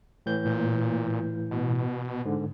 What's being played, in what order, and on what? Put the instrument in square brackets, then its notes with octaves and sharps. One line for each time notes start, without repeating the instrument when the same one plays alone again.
[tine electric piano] A2 E3 G6
[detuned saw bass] A#2
B2
[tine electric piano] G#2 D3